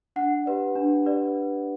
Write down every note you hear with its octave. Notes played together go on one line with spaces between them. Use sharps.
D4 F#5
G4 B4 D5
D4
G4 B4 D5